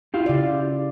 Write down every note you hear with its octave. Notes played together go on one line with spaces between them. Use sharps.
E4 F4 G4
C#3 D5